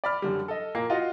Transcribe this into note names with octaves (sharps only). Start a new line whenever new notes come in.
D5 B5 F6
F#2 D3 G3
A4 D#5
A#2 A#3 C7
F4 F#4 D#5